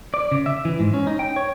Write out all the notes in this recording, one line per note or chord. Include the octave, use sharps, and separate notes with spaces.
D5
C#3
E5
E3
G#2
C#4
D#4
G5
C#5